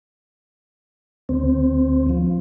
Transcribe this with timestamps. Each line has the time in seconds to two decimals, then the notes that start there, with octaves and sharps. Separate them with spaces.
1.29 D2 C4
2.09 F3